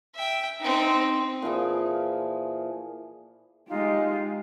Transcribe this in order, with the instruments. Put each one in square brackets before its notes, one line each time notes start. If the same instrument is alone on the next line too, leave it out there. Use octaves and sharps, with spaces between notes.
[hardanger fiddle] E5 G5
C4 D#4
[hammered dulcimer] A#2 E3 F3 G#4
[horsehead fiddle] G#3 G4 [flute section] D#4 F4